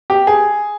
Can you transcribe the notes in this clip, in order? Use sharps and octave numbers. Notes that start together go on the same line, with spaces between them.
G4
G#4